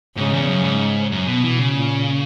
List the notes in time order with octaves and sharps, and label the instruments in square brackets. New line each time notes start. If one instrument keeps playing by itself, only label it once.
[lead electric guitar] G#2 [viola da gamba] C#3
[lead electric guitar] E2
F#2
G#2
F#2
B2
[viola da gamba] B2 [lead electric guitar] E3
[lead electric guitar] C#3
[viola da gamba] A#2